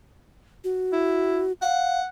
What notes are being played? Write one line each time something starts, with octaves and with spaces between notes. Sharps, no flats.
F#4
E4
F5 F#5